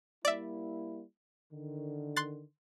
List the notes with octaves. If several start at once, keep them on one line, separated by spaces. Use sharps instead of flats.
G3 A#3 E4 D5 E5
D3 D#3
C6 F#6 A6